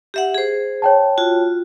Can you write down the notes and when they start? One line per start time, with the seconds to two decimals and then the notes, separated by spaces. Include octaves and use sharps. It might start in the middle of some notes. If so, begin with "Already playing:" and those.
0.14 G4 E5 F#5
0.34 G#4 C5
0.82 C#5 G5 A5
1.18 F4 F#4